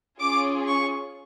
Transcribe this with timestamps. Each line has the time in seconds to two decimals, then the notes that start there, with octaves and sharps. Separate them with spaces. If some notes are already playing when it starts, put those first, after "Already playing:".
0.20 C#4 F4 G#4 D6
0.67 C#6